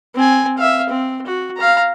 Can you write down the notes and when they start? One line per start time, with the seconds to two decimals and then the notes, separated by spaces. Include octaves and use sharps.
0.15 C4 G#5
0.58 E5 F5
0.89 C4
1.26 F#4
1.57 F5 A#5